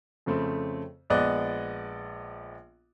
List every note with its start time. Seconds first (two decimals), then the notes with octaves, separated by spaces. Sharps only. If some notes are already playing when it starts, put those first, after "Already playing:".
0.26 F2 C#3 A3 C4
1.10 A#1 G#3 B3 D5 D#5 F#6